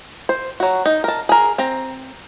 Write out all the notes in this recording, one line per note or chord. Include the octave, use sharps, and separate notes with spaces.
C5
F#3 F#4
D#4
A#4 A5
G#4 A#4
C4 A#5